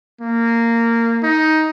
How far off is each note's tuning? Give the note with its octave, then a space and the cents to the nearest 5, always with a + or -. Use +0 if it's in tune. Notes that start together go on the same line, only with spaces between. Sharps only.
A#3 -15
D#4 +10